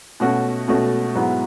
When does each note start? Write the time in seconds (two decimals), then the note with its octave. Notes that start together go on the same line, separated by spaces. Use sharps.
0.20 B2 A3 C#4 F#4
0.68 B2 A3 C#4 F#4
1.15 G#2 F#3 B3 E4